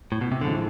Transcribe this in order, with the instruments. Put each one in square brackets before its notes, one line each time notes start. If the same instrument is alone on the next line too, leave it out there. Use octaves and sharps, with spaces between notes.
[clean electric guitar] A2
B2
C3
[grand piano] A1 A2 F3 G#3 [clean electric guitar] D3